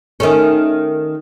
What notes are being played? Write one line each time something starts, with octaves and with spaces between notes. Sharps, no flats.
D#3 A3 C#4